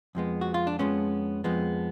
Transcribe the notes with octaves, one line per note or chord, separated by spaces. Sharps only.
F2 F3 G#3 B3
F#4
F4
D4
F2 F3 G#3 B3 C#4
F2 F3 G#3 B3